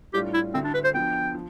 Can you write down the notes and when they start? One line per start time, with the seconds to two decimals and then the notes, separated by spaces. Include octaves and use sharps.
0.13 A2 G3 D4 F4 G4
0.34 E4
0.54 D2 D3 A3 C4 E4
0.64 D4
0.74 B4
0.84 C5
0.94 D3 F3 B3 G5
1.34 F3